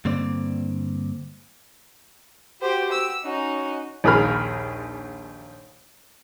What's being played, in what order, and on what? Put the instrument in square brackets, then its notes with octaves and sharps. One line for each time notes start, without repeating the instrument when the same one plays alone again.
[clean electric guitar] G2 D3 A#3 C4 D5
[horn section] F#4 G4 [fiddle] C5
[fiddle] E6
[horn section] C#4 F#4 [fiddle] D#4
[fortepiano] A#1 D#2 G#4 A#4 B5 F6